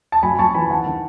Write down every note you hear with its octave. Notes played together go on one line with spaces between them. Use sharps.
A5
F#2 G#5 B5
F#2 A5 C#6
E3 G#5 B5
D#3 F#5 A5
D#3